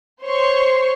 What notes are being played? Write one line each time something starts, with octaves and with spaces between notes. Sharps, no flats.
C5 C#5 C6 C#6